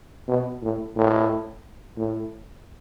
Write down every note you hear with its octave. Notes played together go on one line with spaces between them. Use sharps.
B2
A2
A2
A2